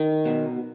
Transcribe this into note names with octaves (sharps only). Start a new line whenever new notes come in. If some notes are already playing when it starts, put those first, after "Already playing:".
Already playing: D#3
B2